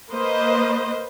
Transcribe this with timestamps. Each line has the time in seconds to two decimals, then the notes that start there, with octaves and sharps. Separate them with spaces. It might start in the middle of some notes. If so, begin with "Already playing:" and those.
0.12 A#3 B4 C5 D#5